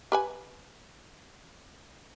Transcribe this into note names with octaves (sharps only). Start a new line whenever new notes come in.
G4 B4 G#5